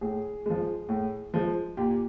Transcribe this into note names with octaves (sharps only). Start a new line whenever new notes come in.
A2 G#4
F3 G#3
A2
F3 G#3
A#2 G4